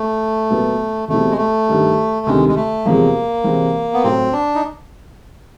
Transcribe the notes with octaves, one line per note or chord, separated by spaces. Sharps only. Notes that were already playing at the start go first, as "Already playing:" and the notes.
Already playing: A3
A#2 F#3 B3
E2 B2 G3 A3 C4 E4
G#3
A3
G2 D#3 G3
D2 C3 D#3 G3 G#3
G#3
A3
E2 C3 F3 G#3 A#3
C3 E3 G#3 C4
B3
A2 F#3 A3 C4
D4
D#4